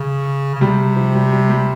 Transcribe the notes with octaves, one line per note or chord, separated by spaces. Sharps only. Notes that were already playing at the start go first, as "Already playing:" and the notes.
Already playing: C#3
C#3
C3 G3
F3
G3
G3
G3